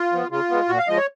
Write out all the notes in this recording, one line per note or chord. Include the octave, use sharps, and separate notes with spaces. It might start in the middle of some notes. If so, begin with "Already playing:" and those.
Already playing: F4
F3 B3
C#3 F4
G#3 B3
A#2 F#4
F5
F3 G#3 D#5
C#5